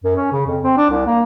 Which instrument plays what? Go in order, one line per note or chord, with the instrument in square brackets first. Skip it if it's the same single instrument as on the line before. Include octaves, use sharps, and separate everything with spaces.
[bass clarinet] F#2
C#4
C#3
F2
C4
D4
C2
A#3